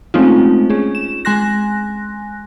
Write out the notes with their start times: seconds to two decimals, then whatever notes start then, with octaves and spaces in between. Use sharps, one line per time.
0.14 G#3 A3 C4 C#4 D#4 F4
0.70 C#4 G#4
0.95 E7
1.25 G#3 G#5 C6 F#6 A#6